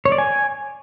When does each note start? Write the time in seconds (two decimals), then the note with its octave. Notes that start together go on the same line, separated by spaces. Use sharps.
0.05 C#5
0.12 D5
0.18 G#5